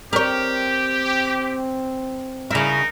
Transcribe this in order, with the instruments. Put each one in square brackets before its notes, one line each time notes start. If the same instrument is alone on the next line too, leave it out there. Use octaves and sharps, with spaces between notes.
[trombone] C4 [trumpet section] G4 [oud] A#4 C#5
[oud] C#3 E4 [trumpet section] D#4 A#4